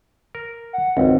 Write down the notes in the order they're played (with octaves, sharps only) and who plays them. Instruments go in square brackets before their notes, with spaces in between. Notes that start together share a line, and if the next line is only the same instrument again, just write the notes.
[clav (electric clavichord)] A#4
[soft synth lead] F#5
[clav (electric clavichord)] G#1 C#2 [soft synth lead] C4